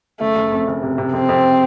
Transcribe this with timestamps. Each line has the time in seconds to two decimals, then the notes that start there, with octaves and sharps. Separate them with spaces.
0.20 F#1 A3
0.36 F#1
0.51 F2
0.67 F#1
0.83 C3
0.98 C3
1.13 F2 C4
1.29 F2